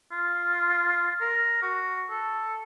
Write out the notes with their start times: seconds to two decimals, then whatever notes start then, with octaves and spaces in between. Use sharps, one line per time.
0.11 F4
1.20 A#4
1.62 F#4
2.10 A4